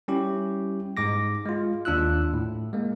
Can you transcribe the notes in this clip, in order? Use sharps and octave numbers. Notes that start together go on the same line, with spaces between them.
G3 C#4 E4 G4
G#2 G#3 D6 A#6
G#3 F4
D#2 D4 F4 E6 F#6
A2
G#3 A#3